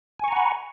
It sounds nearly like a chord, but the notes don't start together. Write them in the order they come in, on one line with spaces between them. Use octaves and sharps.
G#5 C#6 A#5 F#5 B5